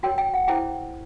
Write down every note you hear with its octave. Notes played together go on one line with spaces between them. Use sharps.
F#4 A#4 C#5 G5
G5
F#5
E4 G#4 C5 G5